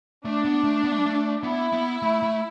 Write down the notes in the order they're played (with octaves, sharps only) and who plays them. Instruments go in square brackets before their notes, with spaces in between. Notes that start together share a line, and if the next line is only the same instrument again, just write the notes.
[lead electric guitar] A3 [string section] D4
[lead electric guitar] B3
A3
B3
A3
G3
A3
[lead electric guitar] B3 [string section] E4
[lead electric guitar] B3
A3
A3